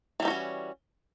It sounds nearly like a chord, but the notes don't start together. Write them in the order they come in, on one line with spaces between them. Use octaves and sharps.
E3 G3 D#4 F#4 C#4